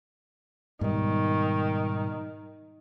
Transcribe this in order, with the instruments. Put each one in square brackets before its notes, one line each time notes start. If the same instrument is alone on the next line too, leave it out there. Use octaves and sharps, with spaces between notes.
[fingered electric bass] G#2 B2 G3 [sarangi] D#3